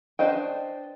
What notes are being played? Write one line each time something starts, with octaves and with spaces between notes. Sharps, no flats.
D4 B4 C5 D#5 G5